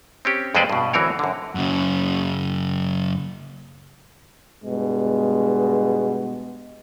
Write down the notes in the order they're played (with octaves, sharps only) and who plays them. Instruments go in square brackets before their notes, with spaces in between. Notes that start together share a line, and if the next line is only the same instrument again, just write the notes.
[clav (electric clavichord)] C4 C#4 G4
F2 G#3 C4 B4 C5 D5
G2 B2
D2 E3 C4 A#4 C#5
F#2 D3
[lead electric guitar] F#2 C#3
[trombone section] G2 B2 G#3